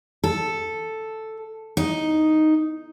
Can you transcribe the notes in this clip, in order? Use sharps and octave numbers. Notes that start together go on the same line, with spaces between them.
A4
D#4